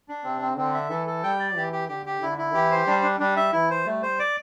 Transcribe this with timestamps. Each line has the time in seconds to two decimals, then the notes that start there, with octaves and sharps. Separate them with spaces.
0.09 D4
0.24 C3 C4
0.41 C4
0.57 D3 C4
0.74 E5
0.90 E3 A4
1.07 A4
1.23 G3 G5
1.39 D5
1.56 E3 G4
1.72 G4
1.89 D3 G4
2.06 G4
2.21 D3 E4
2.38 E4
2.54 E3 G4
2.71 C5
2.87 G3 D4
3.03 D4
3.20 G3 D4
3.36 E5
3.53 E3 E4
3.70 C5
3.85 G3 A3
4.02 C5
4.19 D5